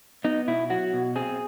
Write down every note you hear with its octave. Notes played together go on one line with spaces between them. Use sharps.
B3 D#4
B2 E4
F#3 F#4
B2
C4 G#4